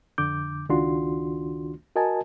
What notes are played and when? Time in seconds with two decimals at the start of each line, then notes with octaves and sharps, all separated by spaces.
0.18 F2 D3 D6 G6
0.69 C#2 D#3 D4 F4 F#4 C6
1.95 F#4 A#4 D#5 G#5 A5